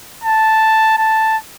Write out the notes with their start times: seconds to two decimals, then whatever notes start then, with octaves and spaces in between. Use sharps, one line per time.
0.24 A5
0.98 A5